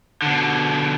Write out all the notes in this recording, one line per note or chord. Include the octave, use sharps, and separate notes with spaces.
B2 D3